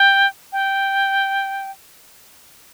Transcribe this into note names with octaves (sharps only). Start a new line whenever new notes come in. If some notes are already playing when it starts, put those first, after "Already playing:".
Already playing: G5
G5